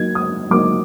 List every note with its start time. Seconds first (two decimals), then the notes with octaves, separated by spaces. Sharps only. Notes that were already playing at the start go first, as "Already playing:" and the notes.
Already playing: F#3 A#3 D#4 G#6
0.15 D#6
0.51 F#3 A#3 D#4 D6